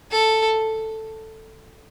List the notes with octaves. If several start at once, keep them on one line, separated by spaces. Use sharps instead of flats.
A4